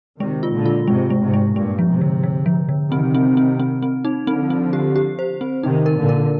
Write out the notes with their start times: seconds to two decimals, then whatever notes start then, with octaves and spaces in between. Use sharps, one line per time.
0.20 C3 D#3 G#3
0.43 F4
0.54 A#2 D3
0.66 F4
0.87 G#2 C3 G#3
1.10 G#3
1.22 G#2 C3
1.34 G#3
1.55 G2 A#2 G#3
1.79 F3
1.89 G#2 C3
2.01 D3
2.24 D3
2.46 F3
2.69 D3
2.92 C3 D#3 C4
3.14 C4
3.37 C4
3.59 C4
3.82 C4
4.05 D#4
4.27 D3 F3 C4
4.50 C4
4.73 G4
4.96 G4
5.19 C5
5.41 C4
5.63 C3 D#3 D#4
5.86 A#4
5.97 A#2 D3
6.09 A#4